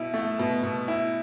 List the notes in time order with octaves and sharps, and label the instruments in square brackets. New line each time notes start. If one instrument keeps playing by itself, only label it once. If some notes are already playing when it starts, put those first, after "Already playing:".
Already playing: [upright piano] B2 E4
A3
B2
B2
E4